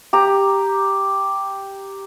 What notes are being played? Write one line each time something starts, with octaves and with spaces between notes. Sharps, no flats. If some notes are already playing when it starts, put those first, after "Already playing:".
G4 A#5